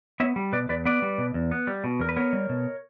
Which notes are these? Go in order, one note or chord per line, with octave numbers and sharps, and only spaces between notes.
B3 C#5 E5
G3
B2 B4 D5
E2 B4 D5
B3 B4 D5
G3
B2
E2
B3
G3
B2
E2 A#4
B4
B3 A#4 C#5
G3
B2